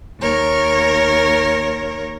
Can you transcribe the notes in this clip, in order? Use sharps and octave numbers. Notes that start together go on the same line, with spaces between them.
D#2 A#4 C#5